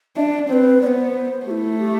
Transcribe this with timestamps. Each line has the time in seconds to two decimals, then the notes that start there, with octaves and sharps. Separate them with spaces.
0.17 D4 E5
0.21 D5
0.49 C4 C5
0.53 B4
0.81 B3 D5
0.87 C5
1.46 A3 G4
1.51 E4
1.79 G4